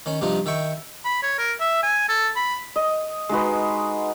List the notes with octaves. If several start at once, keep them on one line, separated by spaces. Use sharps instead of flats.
D#3 C#4
G2 C3 F3 D#4 F4
D#3 E5 G5 C#6
B5
C#5
A#4
E5
G#5
A4
B5
D#5
G#3 D#4 F#4 B4